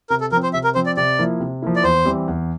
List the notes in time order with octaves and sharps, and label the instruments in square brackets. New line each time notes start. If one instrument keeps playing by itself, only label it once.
[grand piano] C3 [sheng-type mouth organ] A#4
[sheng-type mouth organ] A4
[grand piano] F3 [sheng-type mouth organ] A#4
[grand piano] C4
[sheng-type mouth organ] C5
[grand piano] C3 [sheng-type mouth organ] E5
[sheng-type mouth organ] A#4
[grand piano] F3 C4 [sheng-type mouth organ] C5
[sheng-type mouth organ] D5
[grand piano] C3 [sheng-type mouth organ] D5
[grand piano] F3 A#3 E4
C3
F3 A#3 E4
[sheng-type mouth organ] D5
[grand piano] E2 [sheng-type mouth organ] C5
[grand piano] E3 G3 C4 G4
E2